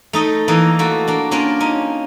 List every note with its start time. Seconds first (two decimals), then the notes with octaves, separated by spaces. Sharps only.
0.13 A3 D#4 D#5
0.48 E3 A#3 D#4
0.79 A3 A#3 F#4
1.08 A#3 D4
1.31 A#3 C#4 D4 F4
1.60 C#4 D#4